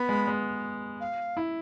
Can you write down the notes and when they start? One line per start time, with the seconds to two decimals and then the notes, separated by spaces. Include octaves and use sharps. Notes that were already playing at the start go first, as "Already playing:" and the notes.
Already playing: B3 B5
0.09 G#3
0.27 G#3
1.00 F5
1.37 E4